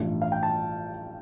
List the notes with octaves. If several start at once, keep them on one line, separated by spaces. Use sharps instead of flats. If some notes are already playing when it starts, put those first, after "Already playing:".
Already playing: A1 G2 F3 A3
F5
G5
A5